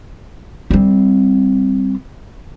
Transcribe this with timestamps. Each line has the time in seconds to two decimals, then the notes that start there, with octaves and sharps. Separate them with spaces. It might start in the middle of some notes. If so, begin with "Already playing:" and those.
0.70 G3 C4